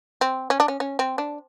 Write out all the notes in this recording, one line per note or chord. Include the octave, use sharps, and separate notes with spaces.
C4
C#4
D4
C#4
C#4
C4
D4